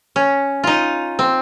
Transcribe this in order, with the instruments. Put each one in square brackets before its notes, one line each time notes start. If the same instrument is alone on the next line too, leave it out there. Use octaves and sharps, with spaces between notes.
[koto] C#4
D#4 F4
C4